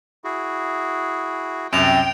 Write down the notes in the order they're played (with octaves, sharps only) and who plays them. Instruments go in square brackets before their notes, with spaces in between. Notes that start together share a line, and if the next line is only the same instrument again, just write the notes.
[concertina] E4 F#4 G#4
[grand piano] C2 F#2 [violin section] G5 [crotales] D7 F7